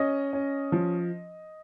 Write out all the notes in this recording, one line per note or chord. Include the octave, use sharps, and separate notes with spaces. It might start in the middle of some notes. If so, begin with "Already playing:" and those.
Already playing: C#4 D#5
C#4
F3